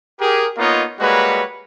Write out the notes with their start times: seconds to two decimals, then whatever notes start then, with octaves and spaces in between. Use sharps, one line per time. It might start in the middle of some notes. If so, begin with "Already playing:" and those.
0.20 G4 G#4 A#4
0.58 A#3 B3 D#4 F4 C#5 D#5
1.00 G3 G#3 A#3 F#4 B4 C#5